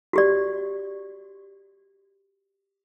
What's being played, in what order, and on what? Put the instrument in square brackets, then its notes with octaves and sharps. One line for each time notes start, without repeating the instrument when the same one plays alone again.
[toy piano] F#4 G4 D5